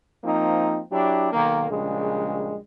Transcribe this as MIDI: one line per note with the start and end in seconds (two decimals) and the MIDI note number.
0.24 0.80 53
0.24 0.80 58
0.24 0.80 60
0.24 0.80 63
0.92 1.31 54
0.92 1.31 62
0.92 1.31 64
0.92 1.31 67
1.32 1.69 35
1.32 1.69 51
1.32 1.69 58
1.71 2.57 34
1.71 2.57 49
1.71 2.57 55
1.71 2.57 56